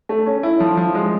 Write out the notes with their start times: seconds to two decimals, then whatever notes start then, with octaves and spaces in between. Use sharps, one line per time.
0.09 A3
0.26 C#4
0.43 E4
0.60 F3
0.77 F3
0.95 G#3